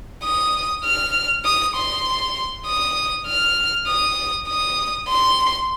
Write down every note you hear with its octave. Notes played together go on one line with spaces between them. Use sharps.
D#6
F6
D#6
C6
D#6
F6
D#6
D#6
C6